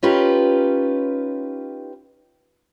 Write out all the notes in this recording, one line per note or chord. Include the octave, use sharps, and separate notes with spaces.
C#4 D#4 F4 G4 B4